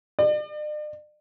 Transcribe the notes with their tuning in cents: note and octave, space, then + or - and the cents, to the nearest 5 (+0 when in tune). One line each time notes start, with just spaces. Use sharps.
D5 +45